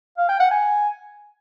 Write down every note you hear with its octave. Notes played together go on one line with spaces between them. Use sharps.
F5
G5
F#5
G#5